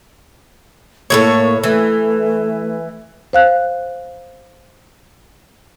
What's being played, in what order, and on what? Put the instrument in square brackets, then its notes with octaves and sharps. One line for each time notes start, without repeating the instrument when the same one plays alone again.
[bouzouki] A2 G#3 C#5 [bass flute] A#3
[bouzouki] E3 [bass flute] A3
[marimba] C5 F5 F#6